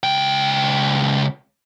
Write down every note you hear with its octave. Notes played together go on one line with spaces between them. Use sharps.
C#2 G5